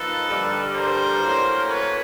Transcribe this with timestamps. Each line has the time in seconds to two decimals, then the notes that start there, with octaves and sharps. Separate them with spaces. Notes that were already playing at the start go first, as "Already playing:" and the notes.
Already playing: F3 A#3 D#4 A4 B4
0.26 G2 D3 G3
0.73 A#4 C5
1.21 A2 F#3 A#3 C#4
1.69 B4 C#5